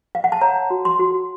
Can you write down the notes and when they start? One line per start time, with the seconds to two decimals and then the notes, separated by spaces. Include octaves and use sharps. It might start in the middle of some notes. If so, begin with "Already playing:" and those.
0.15 F5
0.24 F#5
0.32 A5
0.41 C#5 A#5
0.70 F#4
0.85 C6
0.99 F#4